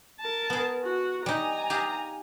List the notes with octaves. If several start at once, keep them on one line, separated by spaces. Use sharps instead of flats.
A#4 A5
B3 G#4
F#4
G3 D#4 G#5 A#5
G4 G#4 F5